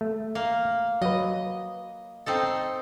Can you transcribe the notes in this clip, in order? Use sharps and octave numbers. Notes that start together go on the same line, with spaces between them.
A3
A#3
F#3 B4 D#5
C4 D#4 A4